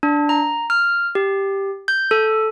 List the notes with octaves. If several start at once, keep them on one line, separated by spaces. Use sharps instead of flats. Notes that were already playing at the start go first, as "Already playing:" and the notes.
D4
A#5
F6
G4
G6
A4